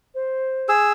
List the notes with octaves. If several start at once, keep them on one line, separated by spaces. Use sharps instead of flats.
C5
G#4 E6